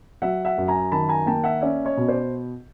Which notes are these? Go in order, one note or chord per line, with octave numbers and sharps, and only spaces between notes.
F#3 E5 F#5
E5 F#5
F#2
G#5 A#5
D#3 A5 B5
G#5 A#5
A#3 G5 A5
E5 F#5
C#4 D5 E5
C#5 D#5
B2
C5 D5